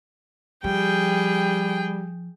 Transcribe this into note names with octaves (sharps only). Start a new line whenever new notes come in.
F3 G3 G#4 G5